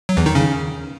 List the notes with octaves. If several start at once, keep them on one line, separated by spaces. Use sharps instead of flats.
F#3
E2 E3
D#3 D#4
C#3 C#4